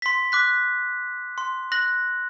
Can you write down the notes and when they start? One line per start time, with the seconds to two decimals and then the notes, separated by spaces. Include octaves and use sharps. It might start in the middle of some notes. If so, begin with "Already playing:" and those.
0.02 C6 B6
0.32 D6 F#6 B6
1.38 C6
1.72 F#6 A#6 F#7